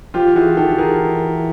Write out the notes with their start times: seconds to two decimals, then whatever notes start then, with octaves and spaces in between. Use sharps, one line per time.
0.14 F3 F4 G4
0.36 E3 F#4 G#4
0.57 D#3 G4 A4
0.69 D#3
0.78 E3 G#4 A#4